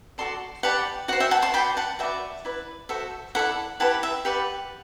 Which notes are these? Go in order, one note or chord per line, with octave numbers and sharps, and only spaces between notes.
F#4 A4 D5 A5 C6
G4 B4 D5 F#5 A5
F#4 C5 F#5
E5 G5
F#5 A5
A5 C6
F#4 B4 D5 G5 B5
F#5 A5
F#4 B4 D5 E5 G5
E4 B4 D5
F#4 A4 C5 E5
E4 A4 D5 F#5
E4 G4 B4 F#5 A5
E5
G4 B4 D5 F#5